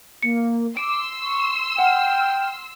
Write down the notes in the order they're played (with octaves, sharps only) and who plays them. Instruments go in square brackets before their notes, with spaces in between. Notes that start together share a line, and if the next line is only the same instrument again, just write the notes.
[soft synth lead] A#3 [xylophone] C#7
[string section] C6 E6 [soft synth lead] D6 [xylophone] D7
[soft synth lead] C#6
[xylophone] F#5 [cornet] G5 [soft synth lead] F6